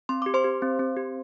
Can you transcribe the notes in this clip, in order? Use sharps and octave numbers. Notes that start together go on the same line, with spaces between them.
C4 C6
G4 D6
C5 C6
G4
C4
C4
G4